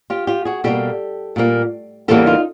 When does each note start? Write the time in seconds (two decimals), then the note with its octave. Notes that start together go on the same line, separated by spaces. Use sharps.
0.10 F4 G4
0.27 F4 G4
0.45 F#4 G#4
0.64 B2 G3 A#3 G4 A4
1.36 A#2 G3 A#3
2.08 E2 C#3 E3 G3 A#3 G4 A4
2.26 D#4 F4